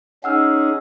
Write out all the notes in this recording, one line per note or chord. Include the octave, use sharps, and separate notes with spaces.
C#4 D#4 G#4 F#5 E6 F6